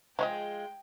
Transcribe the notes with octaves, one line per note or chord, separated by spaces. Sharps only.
F3 G#3 F4 C5 D#5 G5